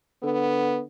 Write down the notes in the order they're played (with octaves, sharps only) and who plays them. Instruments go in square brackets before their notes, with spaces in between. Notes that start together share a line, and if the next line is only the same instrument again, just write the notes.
[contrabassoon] D3 [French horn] B3